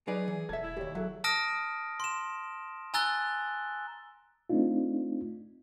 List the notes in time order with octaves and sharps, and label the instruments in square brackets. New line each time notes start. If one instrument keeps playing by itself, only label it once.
[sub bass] F#3 [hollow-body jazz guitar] D#4 B4 D5 [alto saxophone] G#4
[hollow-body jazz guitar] E3
[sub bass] E1 [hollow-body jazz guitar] A4 E5 [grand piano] G#6
[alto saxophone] E4
[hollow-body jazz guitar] D#2 G#2 [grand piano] G4 C#5
[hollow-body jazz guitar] F#3 [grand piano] G#4 A4 E5
[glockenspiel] A5 D#6 F6 A#6 D7
C6 E7
G#5 A#5 E6 F#6 A6 G7
[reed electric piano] A3 C4 D4 D#4 F4